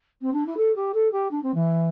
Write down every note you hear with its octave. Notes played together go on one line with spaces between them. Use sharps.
C4
D4
E4
A4
G4
A4
G4
D4
C4
E3